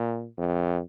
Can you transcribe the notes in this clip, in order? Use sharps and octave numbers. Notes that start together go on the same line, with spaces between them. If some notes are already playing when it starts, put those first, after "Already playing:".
Already playing: A#2
F2